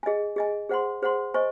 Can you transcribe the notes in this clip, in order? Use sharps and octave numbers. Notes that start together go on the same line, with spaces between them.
G#4 D#5 G#5
G#4 D#5 G#5
G#4 C5 F#5 C6
G#4 C5 F#5 C6
C5 D#5 G#5 C#6